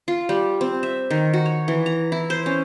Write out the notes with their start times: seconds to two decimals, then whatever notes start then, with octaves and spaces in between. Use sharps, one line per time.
0.08 F4
0.29 G3
0.61 C4
0.83 E5
1.10 D#3
1.33 F#4
1.46 C#5
1.68 E3
1.86 A#5
2.12 E4
2.30 C5
2.46 C#4